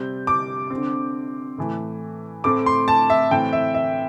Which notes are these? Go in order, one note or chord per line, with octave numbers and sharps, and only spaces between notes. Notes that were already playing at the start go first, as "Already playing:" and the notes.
Already playing: C3 G3 C4 G6
D6
D3 C4
A2 E3 A3
A2 A3 C4 D6
C6
A5
E5
A2 E3 C4 G5
E5
E5